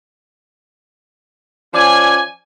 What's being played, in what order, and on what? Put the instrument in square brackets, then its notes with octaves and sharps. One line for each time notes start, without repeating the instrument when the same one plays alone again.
[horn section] F3 C#4 D5 G#5